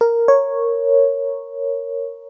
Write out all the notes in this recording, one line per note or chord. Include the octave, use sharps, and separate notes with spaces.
A#4
C#5